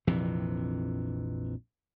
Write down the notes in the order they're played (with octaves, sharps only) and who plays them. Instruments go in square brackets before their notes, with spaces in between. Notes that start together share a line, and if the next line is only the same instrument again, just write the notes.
[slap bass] A#1 F2 C3 E3